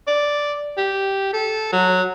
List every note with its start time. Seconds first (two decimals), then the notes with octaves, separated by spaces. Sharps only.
0.07 D5
0.78 G4
1.33 A4
1.72 F#3